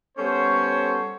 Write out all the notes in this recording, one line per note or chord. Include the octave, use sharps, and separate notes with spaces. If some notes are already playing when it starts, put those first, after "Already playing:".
G3 B3 C#4 A4 C5 C#5